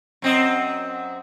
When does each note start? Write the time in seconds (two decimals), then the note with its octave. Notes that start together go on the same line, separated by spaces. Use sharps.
0.22 F#2 C4 D#5